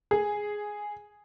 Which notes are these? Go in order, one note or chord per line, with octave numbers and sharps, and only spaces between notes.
G#4